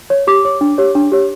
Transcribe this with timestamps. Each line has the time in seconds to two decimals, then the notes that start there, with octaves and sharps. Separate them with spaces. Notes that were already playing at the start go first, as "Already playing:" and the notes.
0.10 C#5
0.27 G4 D6
0.45 C#5
0.61 D4
0.78 G4 C#5
0.95 D4
1.12 G4 C#5